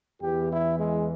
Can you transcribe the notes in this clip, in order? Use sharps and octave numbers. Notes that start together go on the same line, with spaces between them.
E2 E3 G4
E4
G#3